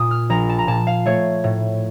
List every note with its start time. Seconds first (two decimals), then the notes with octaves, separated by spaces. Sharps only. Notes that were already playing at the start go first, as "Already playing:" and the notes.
Already playing: A#2 D#6
0.11 F6
0.30 A#1 A#5
0.49 A5
0.59 A#5
0.67 A#2 A5
0.87 F5
1.06 A3 C#5
1.44 A2